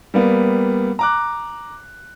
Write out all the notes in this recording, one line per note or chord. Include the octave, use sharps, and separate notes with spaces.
G3 A#3 B3
A#5 D6 F#6